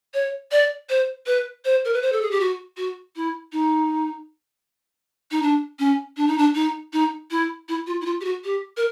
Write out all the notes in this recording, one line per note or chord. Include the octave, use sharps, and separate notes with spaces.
C#5
D5
C5
B4
C5
A#4
B4
C5
A4
G#4
G4
F#4
F#4
E4
D#4
D#4
D4
C#4
D4
D#4
D4
D#4
D#4
E4
E4
F4
E4
F4
G4
F#4
G4
A#4